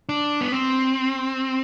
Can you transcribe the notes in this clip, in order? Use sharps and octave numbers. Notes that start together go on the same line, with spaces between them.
D4
B3
C4